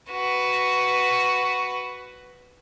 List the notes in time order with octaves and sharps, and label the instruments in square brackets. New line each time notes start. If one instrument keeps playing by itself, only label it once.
[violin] F#4 B4